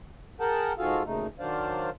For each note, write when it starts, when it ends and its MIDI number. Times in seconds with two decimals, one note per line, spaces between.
0.40 0.73 68
0.40 0.73 70
0.40 0.73 78
0.40 0.73 79
0.40 0.73 81
0.78 1.03 44
0.78 1.03 65
0.78 1.03 66
0.78 1.03 68
0.78 1.03 69
0.78 1.03 77
1.05 1.27 38
1.05 1.27 46
1.05 1.27 49
1.05 1.27 57
1.05 1.27 63
1.39 1.90 51
1.39 1.90 54
1.39 1.90 62
1.39 1.90 72
1.39 1.90 74
1.39 1.90 77